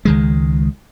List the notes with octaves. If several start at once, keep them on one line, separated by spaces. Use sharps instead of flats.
C#2 D#3 G#3